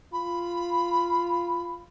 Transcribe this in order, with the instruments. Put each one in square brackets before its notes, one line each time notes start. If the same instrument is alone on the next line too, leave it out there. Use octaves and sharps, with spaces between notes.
[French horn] F4 [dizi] B5